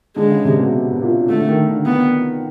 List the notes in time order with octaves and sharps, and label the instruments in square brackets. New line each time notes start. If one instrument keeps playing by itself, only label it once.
[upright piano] D3 [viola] G#3
[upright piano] C#3
C3
B2
B2
B2
A#2
[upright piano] D3 [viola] A3
[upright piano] D#3
D3
[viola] B3